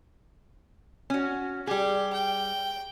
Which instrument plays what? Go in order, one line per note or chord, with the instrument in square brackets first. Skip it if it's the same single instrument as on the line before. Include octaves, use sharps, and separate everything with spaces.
[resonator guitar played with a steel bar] C#4 F#4
[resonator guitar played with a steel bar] G3 G#4 [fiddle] G4
[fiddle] G5